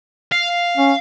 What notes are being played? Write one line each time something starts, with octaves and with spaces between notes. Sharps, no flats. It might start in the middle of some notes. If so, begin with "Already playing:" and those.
F5
C#4